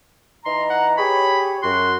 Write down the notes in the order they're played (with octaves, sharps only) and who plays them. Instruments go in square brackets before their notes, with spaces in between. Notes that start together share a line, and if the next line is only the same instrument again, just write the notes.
[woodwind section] E3 D#4 A#5 [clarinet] C6
[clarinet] F#5
[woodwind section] G4 G#4 C#5 [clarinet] B5
[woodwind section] F#2 F#4 [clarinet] C6